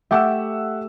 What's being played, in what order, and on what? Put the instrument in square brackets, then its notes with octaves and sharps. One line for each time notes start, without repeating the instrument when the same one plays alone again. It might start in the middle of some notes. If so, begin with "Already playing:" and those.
[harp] A3 G4 D6 [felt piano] E5 F#5 E6